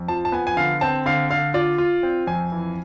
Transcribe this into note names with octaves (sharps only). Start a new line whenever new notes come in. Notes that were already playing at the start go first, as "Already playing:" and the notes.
Already playing: F2
F3 A5
A5
B3 G#5
G#5
D3 F5
C4 A5
D3 F5
D3 F5
F4 D5
F4
C4
F2 G#5
E3